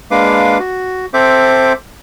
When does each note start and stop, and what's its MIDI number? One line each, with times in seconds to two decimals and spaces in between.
0.11 0.58 56
0.11 0.58 58
0.11 0.58 62
0.11 0.58 71
0.11 0.58 77
0.11 0.58 86
0.59 1.06 66
1.14 1.73 60
1.14 1.73 69
1.14 1.73 72
1.14 1.73 76
1.14 1.73 86